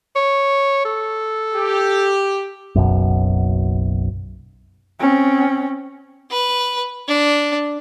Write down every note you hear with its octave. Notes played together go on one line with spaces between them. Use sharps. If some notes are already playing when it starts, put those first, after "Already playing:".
C#5
A4
G4
F#1 B1 F#2
C4 C#4
B4
D4